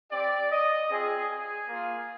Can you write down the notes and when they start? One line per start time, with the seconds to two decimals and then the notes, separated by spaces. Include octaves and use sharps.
0.11 C4 G4 D5
0.51 D#5
0.91 C4 F4 G#4
1.31 G#4
1.70 A#3 F4